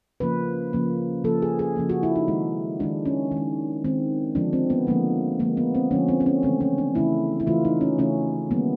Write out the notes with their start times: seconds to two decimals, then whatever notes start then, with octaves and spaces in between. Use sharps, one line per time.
0.20 C#3 F3 A#3 B4
0.73 C#3 F3 A#3
1.24 C#3 F3 A#3 A4
1.42 G#4
1.59 G#4
1.76 C#3 F3 A#3
1.90 F#4
2.03 E4
2.16 D#4
2.28 D#3 G#3
2.80 D#3 G#3 D4
3.06 C#4
3.31 D#3
3.37 G#3
3.84 D#3 G#3 C4
4.35 D3 F3 G#3 D4
4.53 C4
4.70 B3
4.87 D3 F3 G#3 A#3
5.39 D3 F3 G#3 A#3
5.57 B3
5.75 C4
5.91 D3 F3 G#3 C#4
6.08 C4
6.20 C4
6.26 C#4
6.43 C#3 E3 A3 C4
6.61 C#4
6.78 D4
6.95 C#3 E3 A3 E4
7.40 E4
7.47 C#3 E3 A3 F4
7.65 D#4
7.81 C#4
7.98 C#3 E3 A3 C#4
8.51 D#3 G3 A#3 B3